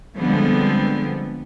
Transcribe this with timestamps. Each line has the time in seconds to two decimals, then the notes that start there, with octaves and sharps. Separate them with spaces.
0.17 D3 F3 G3 G#3 B3 C4